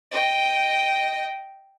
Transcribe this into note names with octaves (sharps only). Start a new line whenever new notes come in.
D#5 G5